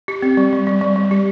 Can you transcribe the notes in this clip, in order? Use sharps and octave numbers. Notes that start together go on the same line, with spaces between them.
G4
C4
G3
G3
G3
G3
G3
G4